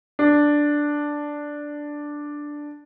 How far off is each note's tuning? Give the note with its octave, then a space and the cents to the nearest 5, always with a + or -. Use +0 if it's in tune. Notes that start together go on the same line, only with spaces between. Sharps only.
D4 +0